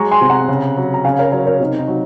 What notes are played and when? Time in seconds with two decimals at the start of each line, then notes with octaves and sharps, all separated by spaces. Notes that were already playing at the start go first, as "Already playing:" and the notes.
Already playing: F#3 G#3 A#5 C#6
0.11 G#5 C6
0.21 C3
0.30 F#5 A#5
0.48 C#3
0.77 F#3
0.94 A#5
1.04 C#3 F5 G#5
1.19 A#4 C#5
1.32 F#3 A#4 C#5
1.46 A#4 C#5
1.60 C3 D#4
1.78 D#4
1.88 F#3